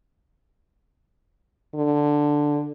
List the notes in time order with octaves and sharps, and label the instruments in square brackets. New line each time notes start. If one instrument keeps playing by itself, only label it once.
[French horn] D3